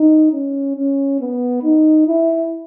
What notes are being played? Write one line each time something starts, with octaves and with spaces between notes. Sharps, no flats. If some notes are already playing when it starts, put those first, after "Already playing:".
Already playing: D#4
C#4
C#4
B3
D#4
E4